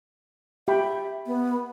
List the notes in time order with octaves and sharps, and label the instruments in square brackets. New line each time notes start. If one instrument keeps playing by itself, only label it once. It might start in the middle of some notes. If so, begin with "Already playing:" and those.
[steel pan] G4 G5 B5 [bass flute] E5
[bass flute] B3